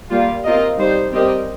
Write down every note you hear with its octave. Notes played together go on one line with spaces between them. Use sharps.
G3 A#3 F4
C4 F4 A#4 D#5
G3 D#4 C5
G3 C4 G4 A#4 D#5